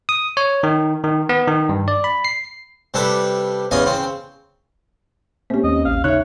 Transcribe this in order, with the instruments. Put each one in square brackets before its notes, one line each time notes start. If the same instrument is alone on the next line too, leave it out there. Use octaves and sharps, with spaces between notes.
[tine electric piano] D#6
C#5
D#3
D#3
B3
D#3
G2
D5
B5
C7
[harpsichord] C3 G3 D4 A4 B4
E2 C#3 D#5 F5 G#5
C#3 C4
[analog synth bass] A3 [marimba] A#3 G4 [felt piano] C4 C#4
[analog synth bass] D#2 [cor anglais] D#5
[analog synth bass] A1 [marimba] D#2 [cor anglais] F5
[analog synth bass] C#3 [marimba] D#4 E5 [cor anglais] C#5 [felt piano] F#6